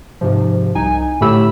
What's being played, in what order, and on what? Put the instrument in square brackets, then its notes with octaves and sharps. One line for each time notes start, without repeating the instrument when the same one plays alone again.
[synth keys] G#2 C3 F3
C2 D#4 G#5
A2 D3 A3 G4 B5 E6